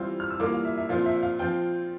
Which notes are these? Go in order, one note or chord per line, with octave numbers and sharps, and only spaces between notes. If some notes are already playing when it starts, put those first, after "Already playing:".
Already playing: E3 G3 C4 F4 E6
F6
E6
E3 G3 A#3 F4 D6
F5
E5
E5
A#2 F3 C4 F4 F5
E5
F5
F3 C4 F4 G5